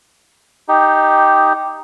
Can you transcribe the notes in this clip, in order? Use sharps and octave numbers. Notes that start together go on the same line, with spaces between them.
D#4 G4